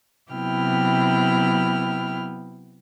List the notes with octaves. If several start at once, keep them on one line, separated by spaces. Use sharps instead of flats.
C3 F#3 B3 E4 G5 F6